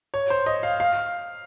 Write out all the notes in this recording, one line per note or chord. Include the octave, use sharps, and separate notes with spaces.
C#5
C5
D#5
F5
F5